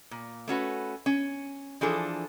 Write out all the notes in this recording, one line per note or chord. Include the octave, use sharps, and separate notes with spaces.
A#2
A3 C#4 F#4 B4
C#4
E3 F3 D4 G#4 A4